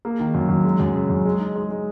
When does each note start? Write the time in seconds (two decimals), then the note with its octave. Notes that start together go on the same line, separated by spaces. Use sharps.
0.05 A#3
0.20 D#3
0.34 F#2
0.49 F#2
0.64 G#3
0.80 F#2
0.94 C#3
1.09 F#2
1.26 G#3
1.40 D#4
1.56 G#3
1.71 G#3